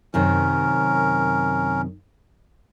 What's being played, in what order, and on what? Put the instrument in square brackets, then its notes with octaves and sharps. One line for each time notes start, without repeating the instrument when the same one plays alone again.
[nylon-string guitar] F#2 C3 D#3 [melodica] C#4 A#4